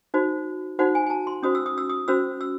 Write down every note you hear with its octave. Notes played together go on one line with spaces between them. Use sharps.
D#4 F#4 C5
D#4 F#4 C5 F#5
G#5
G#5
A5
C6
C#4 F#4 C5 D#6
E6
D#6
E6
D#6
C#4 F#4 C5 E6
E6